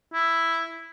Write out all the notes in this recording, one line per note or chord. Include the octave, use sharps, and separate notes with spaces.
E4